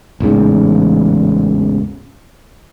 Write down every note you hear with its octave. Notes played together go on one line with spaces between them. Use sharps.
A1 E2 G#2 C#3